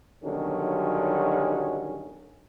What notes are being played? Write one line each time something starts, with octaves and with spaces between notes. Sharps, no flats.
B1 D3 D#3 F#3 G3 C#4